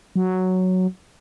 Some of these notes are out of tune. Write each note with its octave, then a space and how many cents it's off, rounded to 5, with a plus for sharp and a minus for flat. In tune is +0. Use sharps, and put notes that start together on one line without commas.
F#3 +0